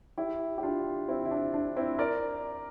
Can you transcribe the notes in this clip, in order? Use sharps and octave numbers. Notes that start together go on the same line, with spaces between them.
E4 G4
G4
D4 F4
C4 E4
E4
D4
D4
C4 E4
A#4 D5